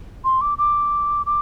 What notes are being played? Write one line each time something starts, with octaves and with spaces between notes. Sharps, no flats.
C6
D6
D6
D6